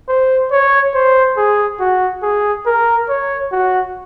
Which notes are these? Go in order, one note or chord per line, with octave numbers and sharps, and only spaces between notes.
C5
C#5
C5
G#4
F#4
G#4
A#4
C#5
F#4